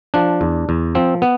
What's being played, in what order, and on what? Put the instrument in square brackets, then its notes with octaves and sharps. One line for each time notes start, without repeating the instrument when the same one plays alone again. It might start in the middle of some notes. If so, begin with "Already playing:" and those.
[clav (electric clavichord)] F3 D4
E2
E2
F3 C4
B3